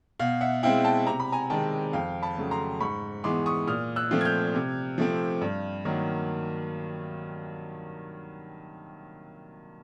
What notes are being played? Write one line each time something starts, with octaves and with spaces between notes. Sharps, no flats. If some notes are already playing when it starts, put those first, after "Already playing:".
B2 F5
E5 F#5
G#3 C4 E4 F5 G5
G5 A5
C3 A#5
B5
G#5 A#5
D#3 G#3 C4 G5 A5
F2 F5 G5
A5 B5
C#3 F#3 A3
A#5 C6
G#2 B5 C#6
E3 G#3 B3 C6 D6
C#6 D#6
A#2 D#6 F6
E6 F#6
F3 A3 C4 F4
G#6
F6 G6
C3
F3 A3 C4
G2
D#3 F#3 A#3